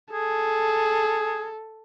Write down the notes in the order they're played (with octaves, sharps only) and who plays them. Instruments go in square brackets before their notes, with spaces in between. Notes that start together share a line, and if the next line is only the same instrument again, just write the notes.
[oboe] G#4 [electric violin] A4